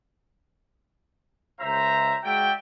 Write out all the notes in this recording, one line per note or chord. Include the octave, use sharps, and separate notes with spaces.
C#2 C5 E5 A#5
G#3 F#4 D5 E5 G5